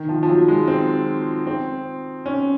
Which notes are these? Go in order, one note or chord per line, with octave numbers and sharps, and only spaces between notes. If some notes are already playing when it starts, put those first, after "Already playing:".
Already playing: D#3
F3
F3
F#3
G#3
C4
C4
C#4